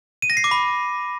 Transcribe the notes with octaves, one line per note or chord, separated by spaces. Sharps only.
D#7
A#6
C7
D6
B5